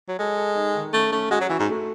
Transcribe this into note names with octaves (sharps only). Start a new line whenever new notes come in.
F#3
G#3 A4
A4
D#4
D#3
A3 C#4
A3 C#4
G#3 F#4
F#3
E3 F#4
G#2
A3